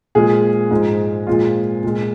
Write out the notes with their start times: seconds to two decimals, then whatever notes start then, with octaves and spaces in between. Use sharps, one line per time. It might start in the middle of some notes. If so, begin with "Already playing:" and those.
0.15 A#2 F3 G#3 G#4
0.71 G#2 F3 G#3
1.27 A#2 F3 G#3 F4
1.83 A#2 G#3